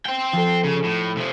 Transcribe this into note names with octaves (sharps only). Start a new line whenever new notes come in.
C5 G5
F3 A4
C#3
A2 D7
C3 F3